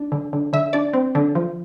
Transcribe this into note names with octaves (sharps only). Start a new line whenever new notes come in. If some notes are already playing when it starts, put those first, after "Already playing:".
Already playing: D4
D3
D3
D3 E5
D4 D5
C4
D3
F3